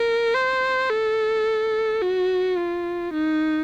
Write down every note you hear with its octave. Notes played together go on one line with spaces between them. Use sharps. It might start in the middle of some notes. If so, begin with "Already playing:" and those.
Already playing: A#4
C5
A4
F#4
F4
D#4